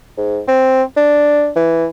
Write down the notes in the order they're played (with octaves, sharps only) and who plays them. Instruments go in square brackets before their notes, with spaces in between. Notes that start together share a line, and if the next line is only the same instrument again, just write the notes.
[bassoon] G#2
C4
D4
E3